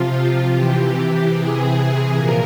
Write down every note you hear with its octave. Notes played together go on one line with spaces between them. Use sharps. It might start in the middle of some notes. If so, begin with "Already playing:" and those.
Already playing: C3 F3 F4
C3 E3 G4
C3 E3 G#4
A#2 F3 A#4